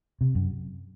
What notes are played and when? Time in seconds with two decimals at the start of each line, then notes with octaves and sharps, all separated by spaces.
0.21 C3
0.35 F#2